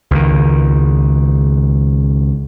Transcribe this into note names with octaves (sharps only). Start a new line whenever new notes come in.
C#2 D#3